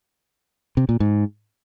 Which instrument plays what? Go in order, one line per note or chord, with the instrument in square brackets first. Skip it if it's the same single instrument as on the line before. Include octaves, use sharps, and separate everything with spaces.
[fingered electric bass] C3
A#2
G#2